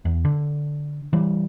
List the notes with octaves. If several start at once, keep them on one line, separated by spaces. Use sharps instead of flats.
E2
D3
E3 G3